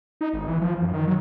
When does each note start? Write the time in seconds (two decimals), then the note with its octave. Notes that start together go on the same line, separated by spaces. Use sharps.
0.21 D#4
0.33 G#1
0.48 E3
0.62 F3
0.81 F#2
0.93 D#3
1.07 F#3